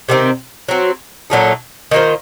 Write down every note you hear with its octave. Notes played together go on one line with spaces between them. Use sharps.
C3 D#3 A3 C4
F#3 C4 F#4
A#2 F#3 A3 D#4
D#3 A#3 F4 C5